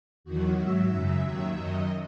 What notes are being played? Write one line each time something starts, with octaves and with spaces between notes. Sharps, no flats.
E2 D#3 F#3 F#4
G#2 F#3 E5
F#2 C#3 F#3
D#2 D#3 F#3
F#2 D#3 F#3 D#5